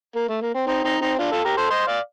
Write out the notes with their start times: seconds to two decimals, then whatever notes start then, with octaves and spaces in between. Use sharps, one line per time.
0.15 A#3
0.29 A3
0.41 A#3
0.54 C4
0.67 C4 D#4
0.84 C4 D#4
1.01 C4 D#4
1.18 D4 F4
1.32 F4 A4
1.44 G4 A#4
1.57 A4 C5
1.70 C5 D#5
1.87 D5 F5